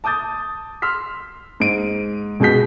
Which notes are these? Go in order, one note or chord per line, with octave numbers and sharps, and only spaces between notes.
A5 D6 D#6 G6 A6
C6 E6 F6 B6
G#2 D7 D#7
C#2 B2 G#4 G6 B6